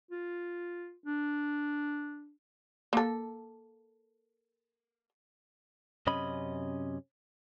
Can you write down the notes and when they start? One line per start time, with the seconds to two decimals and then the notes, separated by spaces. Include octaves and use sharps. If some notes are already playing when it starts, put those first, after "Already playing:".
0.11 F4
1.06 D4
2.93 A#3 A4
6.07 F#2 C3 C#4 D#5 B5